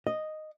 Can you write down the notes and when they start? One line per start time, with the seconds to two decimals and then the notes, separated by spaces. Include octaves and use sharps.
0.07 D#5